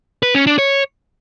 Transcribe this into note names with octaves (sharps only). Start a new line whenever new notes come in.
B4
C#4
D4
C#5